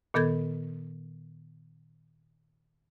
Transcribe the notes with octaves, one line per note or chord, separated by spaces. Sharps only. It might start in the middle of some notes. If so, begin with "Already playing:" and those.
A#2 D#3 B3 A4 G6 G#6